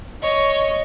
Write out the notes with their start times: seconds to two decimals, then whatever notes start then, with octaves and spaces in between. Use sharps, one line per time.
0.22 C#5 D#5